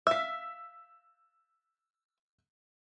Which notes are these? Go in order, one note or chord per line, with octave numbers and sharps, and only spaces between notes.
E5 F5 E6 B6